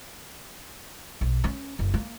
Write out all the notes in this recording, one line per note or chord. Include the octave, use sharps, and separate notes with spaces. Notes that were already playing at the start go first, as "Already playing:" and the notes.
B1
C#4
F#1
A#3